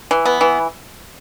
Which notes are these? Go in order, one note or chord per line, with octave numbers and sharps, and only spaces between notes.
E3
B3
E3